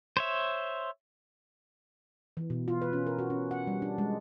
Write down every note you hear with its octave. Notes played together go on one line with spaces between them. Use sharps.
C5 C#5 E5
E3
B2
F4
B4
C#4
A#4
F#4
C#4
F#5
G3
D4
G#3